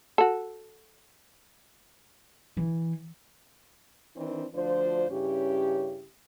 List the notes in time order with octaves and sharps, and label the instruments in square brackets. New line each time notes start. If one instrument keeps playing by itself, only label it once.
[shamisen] F#4 A4
[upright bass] E3
[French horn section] D#3 E3 C4 D4
D2 F3 D4 F4 C5
G2 C#3 C#4 E4 G4